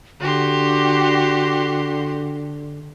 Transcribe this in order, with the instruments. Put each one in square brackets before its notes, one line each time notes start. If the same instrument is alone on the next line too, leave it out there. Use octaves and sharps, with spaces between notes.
[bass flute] D3 [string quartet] F#4 G4 C6